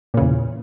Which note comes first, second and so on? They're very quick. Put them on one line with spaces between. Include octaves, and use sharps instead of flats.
A#2 C#3 E2